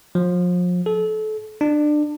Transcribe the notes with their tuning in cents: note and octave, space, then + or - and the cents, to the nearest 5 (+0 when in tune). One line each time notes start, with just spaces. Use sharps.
F3 +35
A4 -30
D4 +25